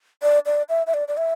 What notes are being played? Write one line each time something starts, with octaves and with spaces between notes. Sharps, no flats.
D5
D5
E5
E5
D5
D5
E5